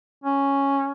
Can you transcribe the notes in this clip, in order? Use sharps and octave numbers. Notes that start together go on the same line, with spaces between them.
C#4